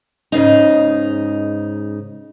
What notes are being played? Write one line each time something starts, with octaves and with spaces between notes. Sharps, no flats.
G#2 C#3 D#4